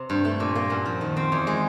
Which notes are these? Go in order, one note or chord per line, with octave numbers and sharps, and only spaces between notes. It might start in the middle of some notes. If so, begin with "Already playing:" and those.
Already playing: C3
G2
A3
A#2
A#3
F#2
F3
D#3
C4
E2
G#3